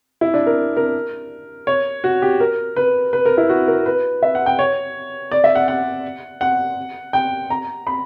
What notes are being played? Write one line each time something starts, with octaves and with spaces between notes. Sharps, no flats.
E4
D4
A#4
A#4
C#5
F#4
G4
A#4
B4
B4
A#4
E4
F#4
A#4
B4
E5
F#5
G5
C#5
D5
E5
F#5
F#5
F#5
G5
A#5
B5